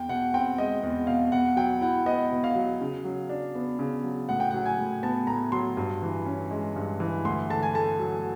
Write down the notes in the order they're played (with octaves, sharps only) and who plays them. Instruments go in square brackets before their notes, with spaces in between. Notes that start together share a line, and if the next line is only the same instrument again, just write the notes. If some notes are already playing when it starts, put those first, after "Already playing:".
Already playing: [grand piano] E2 G5
B2 F#5
C4 G5
G#3 D#5
E2
B2 F5
B2 F#5
F#3 G5
E4 F#5
B3 D#5
B2
F5
F#3
C#3
F#3
D4
B3
C#3
F#3
A2 F#5
G5
F#3 F#5
G#5
A2
B3 A5
A2 A#5
F#3 C6
G2
E3
C#4
G#3
G2
E3
D2 C6
D3 A5
G#5
A3 A5
F#3